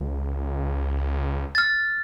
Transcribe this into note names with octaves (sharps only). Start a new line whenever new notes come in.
C#2
F6 A6